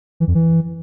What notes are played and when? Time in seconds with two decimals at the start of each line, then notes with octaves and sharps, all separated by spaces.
0.20 E3
0.27 F2
0.35 E3